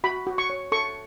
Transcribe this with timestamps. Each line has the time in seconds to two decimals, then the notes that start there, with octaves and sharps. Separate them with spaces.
0.04 F#4 B5
0.27 F#4
0.38 C#6
0.50 C#5
0.72 A4 C#6